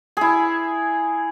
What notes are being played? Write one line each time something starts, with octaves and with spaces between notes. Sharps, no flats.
E4 G#4